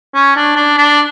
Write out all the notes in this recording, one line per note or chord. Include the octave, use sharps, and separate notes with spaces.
C#4
D4
D4
D4